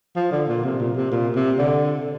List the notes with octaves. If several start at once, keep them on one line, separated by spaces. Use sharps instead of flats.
F3
D3
A#2
C3
A#2
C3
A#2
C3
D3